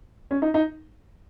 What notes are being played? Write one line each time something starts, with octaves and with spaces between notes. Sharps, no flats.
C#4
D#4
D#4